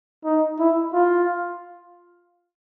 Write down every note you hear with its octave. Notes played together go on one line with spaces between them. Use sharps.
D#4
E4
F4